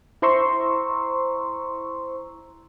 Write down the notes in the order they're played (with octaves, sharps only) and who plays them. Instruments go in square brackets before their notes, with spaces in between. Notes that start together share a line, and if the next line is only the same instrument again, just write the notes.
[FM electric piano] E4 C5 A#5 C6 C#6 E6